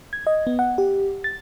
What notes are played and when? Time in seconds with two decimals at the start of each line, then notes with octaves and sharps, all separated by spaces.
0.13 G#6
0.27 D#5
0.47 B3
0.59 F#5
0.78 G4
1.24 A6